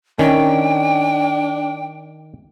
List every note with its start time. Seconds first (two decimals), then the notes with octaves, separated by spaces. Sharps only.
0.19 D#3 C#4 D4 G5